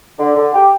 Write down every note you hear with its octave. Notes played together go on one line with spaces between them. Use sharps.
D3
D3
G4